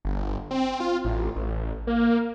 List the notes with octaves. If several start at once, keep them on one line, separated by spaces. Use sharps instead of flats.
G1
C4
F4
A1
A1
A#3